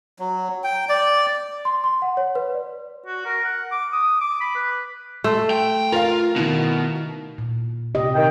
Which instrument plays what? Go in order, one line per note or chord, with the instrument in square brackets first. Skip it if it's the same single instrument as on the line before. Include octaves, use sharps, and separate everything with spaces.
[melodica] F#3
G5
D5
[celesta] C6
C6
F#5
C#5
B4
D5
[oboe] F#4
A#4
F#5
D6
D#6
D6
B5
B4
[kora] A3 [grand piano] C6 C7
[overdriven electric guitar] G5
[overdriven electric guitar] F4 [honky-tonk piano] A#4 F5
[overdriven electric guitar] B2 [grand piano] D#3 E4
[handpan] A#2
C3 G4 D#5
[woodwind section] D#3 G5